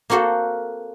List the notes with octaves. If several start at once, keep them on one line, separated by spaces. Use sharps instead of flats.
A#3 C4 F#4 A4 C5